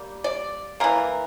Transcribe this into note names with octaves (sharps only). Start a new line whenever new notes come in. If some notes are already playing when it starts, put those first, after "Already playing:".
Already playing: G3 A#3
D5
E3 A#3 A#4